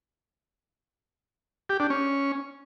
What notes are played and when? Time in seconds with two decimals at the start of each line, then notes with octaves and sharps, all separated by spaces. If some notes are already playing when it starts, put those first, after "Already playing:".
1.69 G4
1.80 D4
1.90 C#4